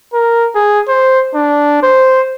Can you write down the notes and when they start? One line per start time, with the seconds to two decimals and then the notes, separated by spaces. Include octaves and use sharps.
0.14 A#4
0.55 G#4
0.88 C5
1.35 D4
1.83 C5